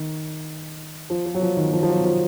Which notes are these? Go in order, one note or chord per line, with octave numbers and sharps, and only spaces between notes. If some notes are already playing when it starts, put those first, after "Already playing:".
Already playing: D#3
F3
F3
F#3
F3
D#3
F3
F3
F#3
F3